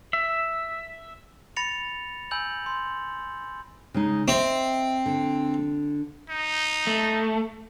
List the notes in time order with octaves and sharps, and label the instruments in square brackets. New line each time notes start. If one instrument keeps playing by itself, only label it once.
[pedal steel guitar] E5
[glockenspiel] B5 A6 A#6 C#7 F7
G#5 B5 E6 G6 F#7
C6
[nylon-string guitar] C#3 G#3 D#4
[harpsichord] C4 [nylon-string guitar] D#5 E5
[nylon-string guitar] D3
[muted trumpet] D#4
[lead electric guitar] A3